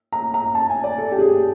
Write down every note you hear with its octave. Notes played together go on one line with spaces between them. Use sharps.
A#5
A#5
A5
G#5
D5
A4
G4
G#4